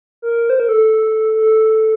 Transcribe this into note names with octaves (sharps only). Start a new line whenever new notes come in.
A#4
C5
A#4
A4
A4